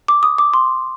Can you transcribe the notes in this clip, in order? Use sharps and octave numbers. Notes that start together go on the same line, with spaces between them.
D6
D#6
D6
C6